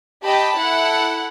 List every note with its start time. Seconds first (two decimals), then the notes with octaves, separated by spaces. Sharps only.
0.24 G4 D#5 G5 A5 B5
0.58 E4 A4 F#5